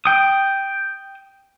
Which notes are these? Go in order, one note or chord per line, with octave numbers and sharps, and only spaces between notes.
G5 D#6